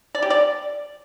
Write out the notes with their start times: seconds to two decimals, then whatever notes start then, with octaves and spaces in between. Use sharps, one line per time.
0.15 D5
0.22 G4
0.30 D5